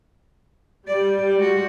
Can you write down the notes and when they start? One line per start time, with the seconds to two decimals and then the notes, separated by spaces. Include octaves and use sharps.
0.88 G3 D5
1.37 G#3 F#4